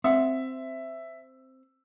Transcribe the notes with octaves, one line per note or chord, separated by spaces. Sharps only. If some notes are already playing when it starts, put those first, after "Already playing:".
C4 E5 F#5